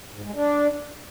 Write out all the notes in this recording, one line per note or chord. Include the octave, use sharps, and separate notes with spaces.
G#2
G#3
D4